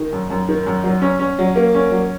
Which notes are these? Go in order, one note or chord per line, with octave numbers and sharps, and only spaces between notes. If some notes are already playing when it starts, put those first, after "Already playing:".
Already playing: D#3
F#2
F#2
D#3
F#2
F#3
C#4
C#4
F#3
A#3
C#4
F#3